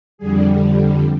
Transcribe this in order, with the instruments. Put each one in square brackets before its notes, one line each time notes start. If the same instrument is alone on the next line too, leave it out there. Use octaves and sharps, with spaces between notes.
[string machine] F2 D3 G3 G#4